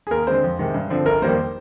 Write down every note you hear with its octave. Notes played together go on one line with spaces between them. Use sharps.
G#4
D#2 A#4
D3 G#3 C4 C5
F2
C3 D#3 G#3
G2
D3 F3 C4
G1 A#4
F2 D#3 G3 A#3 C5